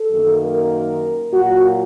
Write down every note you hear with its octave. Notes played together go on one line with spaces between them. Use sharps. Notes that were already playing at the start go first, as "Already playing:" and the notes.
Already playing: A4
F#2 D#3 A#3
A#4
A#2 F#3 A#3 F#4